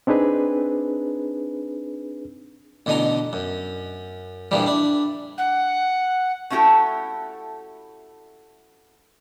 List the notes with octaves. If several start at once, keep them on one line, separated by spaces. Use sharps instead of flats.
C4 D4 D#4 G#4 B4
A1 B2 D3 D#5 G#5 A#5
F#2
A#1 G2 A#2 E3 F3 G3
D4 E4
F#5
A3 C#4 E4 F#4 G4 A4